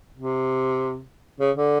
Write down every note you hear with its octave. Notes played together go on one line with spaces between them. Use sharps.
C3
C#3
D3